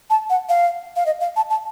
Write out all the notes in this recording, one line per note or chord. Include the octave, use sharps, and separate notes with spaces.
A5
F#5
F5
F5
D#5
F5
A5
A5